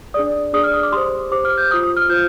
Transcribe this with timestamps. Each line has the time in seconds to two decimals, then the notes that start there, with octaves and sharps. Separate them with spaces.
0.14 D4 G#4 D5 D#6
0.53 D4 G#4 D5 D#6
0.64 F6
0.74 D#6
0.83 D6
0.92 G4 C5 C6
1.31 G4 C5 D6
1.45 F6
1.58 G6
1.71 F4 C5 D#6
1.83 D#6
1.97 F6
2.09 F4 C5 G6